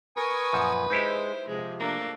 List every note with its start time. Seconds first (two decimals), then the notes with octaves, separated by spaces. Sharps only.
0.17 A#4 B4 G#5 C#6 D#6
0.53 F#2 A#2 F3
0.90 G#3 D#4 E4 G4 C5
1.48 C3 F3 G#3
1.80 A3 A#3 D4 A#5